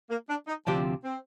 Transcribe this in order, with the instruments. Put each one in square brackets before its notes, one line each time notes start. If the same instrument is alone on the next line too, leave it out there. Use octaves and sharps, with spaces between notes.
[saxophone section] A#3
D4
D#4
[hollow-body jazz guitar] D2 C3 F3 C4 G4 [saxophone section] D4
[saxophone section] C4